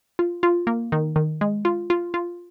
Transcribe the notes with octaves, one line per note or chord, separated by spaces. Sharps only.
F4
F4
A#3
D#3
D#3
G#3
F4
F4
F4